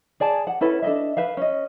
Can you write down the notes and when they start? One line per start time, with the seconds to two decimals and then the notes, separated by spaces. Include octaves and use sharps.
0.20 G#4 D5 G#5 A5
0.47 F#5
0.61 C#4 E4 A4 B4
0.82 D4 A4 D#5 E5
1.17 B4 E5 F5
1.37 C#4 D#5